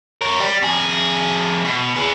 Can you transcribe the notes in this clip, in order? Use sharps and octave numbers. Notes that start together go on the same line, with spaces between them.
A#4 C#5
G3
F2 G#4
B2
G#4 B4